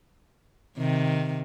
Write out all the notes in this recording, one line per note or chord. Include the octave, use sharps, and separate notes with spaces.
C3 D#3